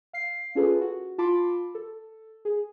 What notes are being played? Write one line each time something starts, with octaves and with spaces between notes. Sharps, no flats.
F5 C7
C#4 F4 G#4 A4 B4
F#4
F4 A5 B5 C6 D6
A4
G#4